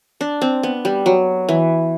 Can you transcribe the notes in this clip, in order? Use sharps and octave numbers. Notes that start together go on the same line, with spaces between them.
D4
C4
B3
G3
F#3
E3